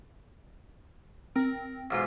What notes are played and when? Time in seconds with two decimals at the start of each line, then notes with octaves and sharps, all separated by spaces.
1.36 C4 A#4
1.91 B1 G#2 F4 F6